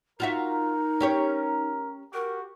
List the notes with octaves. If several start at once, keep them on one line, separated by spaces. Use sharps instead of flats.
D#4 F4 F#4 A#4 E5
C#4 G4 C#5
F#4 G4 A#4